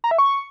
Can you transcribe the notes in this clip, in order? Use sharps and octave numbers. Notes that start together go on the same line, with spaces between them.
A#5
E5
C#6